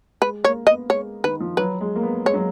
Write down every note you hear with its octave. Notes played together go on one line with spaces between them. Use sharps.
G#3 B4
A#3 C#5
B3 D#5
G#3 C#5
D#3 B4
F3
F#3 B4
G#3
A#3
B3
G#3 C#5
F#3